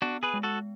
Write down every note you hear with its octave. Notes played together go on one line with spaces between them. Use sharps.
B3 D4 F#4
G#4 B4
G#3
F#4 A4